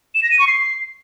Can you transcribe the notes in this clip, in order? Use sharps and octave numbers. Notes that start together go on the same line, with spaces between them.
E7
A#6
D#7
C#6
C7